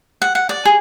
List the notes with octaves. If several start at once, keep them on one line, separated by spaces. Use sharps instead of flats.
F#5
F#5
D5
G#4